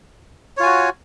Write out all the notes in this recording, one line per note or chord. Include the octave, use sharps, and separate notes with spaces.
F4 F#4 C#5 G#5